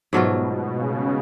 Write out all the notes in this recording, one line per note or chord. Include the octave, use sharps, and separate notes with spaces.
G#2 B2 F#3 A3 F4
C#3